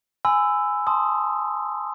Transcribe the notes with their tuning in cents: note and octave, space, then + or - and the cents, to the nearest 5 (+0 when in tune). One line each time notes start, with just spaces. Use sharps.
G#5 +0 B5 +45 E6 +0
A5 +0 C6 +0 D#6 +0